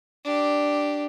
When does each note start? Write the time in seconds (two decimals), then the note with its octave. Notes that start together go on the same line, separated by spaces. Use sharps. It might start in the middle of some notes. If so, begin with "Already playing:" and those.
0.24 D4 G4